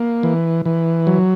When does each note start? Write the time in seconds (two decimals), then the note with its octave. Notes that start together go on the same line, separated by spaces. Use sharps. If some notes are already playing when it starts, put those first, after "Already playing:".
Already playing: A#3
0.23 E3
0.65 E3
1.07 F#3